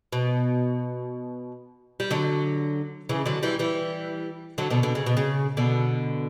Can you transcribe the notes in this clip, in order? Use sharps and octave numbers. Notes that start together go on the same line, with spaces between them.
B2
G3
D3 F#3
C#3 E3
D3 F#3
E3 G3
E3 G3
D3 F#3
B2 D3
B2 D3
C#3
B2
C#3
B2 D3